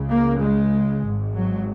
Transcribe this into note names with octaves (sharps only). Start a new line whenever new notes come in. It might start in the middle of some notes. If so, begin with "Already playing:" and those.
Already playing: C#2 C#3
A#3
G#3
G#1 G#2
F#3